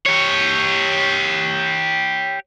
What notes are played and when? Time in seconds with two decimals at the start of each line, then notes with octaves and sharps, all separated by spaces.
0.06 G4 C#5